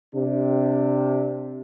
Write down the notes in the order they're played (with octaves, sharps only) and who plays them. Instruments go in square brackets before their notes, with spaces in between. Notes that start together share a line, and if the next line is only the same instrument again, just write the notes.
[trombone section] C3 D4